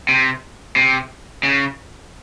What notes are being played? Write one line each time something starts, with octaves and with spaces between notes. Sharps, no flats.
C3
C3
C#3